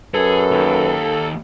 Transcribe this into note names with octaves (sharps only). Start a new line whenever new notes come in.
F#2 G#4 A4 B4
D#2